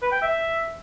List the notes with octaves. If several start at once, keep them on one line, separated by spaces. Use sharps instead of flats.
B4
G5
E5